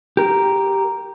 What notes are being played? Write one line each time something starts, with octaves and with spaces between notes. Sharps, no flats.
G4 A#4